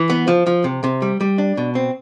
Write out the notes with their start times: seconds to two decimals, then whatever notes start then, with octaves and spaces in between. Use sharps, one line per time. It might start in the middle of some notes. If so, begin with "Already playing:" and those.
Already playing: E3
0.10 B3
0.28 F3
0.47 F3
0.64 C3
0.84 C3
1.02 G3
1.21 G3
1.38 D4
1.57 B2
1.75 C4